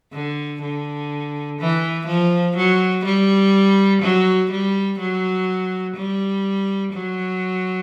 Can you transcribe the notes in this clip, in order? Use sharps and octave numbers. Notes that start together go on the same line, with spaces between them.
D3
D3
E3
F3
F#3
G3
F#3
G3
F#3
G3
F#3